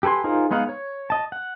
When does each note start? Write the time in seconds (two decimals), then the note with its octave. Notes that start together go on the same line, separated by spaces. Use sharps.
0.03 G4 A4 B4 G#5 C6
0.24 D#4 F4 G#4 A#4 C5
0.51 G#3 B3 D#4 F5 F#5
0.69 C#5
1.10 D#5 A5
1.32 F#5